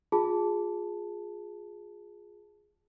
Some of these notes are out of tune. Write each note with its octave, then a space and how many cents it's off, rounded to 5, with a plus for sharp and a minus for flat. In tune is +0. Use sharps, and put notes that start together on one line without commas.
F4 +25 G#4 +0 A5 +0